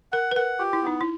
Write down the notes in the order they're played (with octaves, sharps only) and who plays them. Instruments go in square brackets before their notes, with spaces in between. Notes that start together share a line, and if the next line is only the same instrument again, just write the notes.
[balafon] A#4 [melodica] F#5
[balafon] B4
[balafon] A#4 [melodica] F#5
[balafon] F4 [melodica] G4
[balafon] E4
[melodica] B3 [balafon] D#4
[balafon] E4